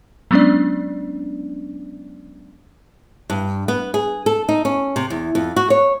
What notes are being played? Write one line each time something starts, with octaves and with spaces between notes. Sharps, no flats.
F#3 G#3 B3 C#4 D4 D5
G2
B3
G#4
A4
D#4
C#4
C3
E2
F2
F#4
C#5